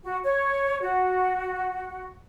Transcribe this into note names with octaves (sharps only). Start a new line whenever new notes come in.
F#4
C#5
F#4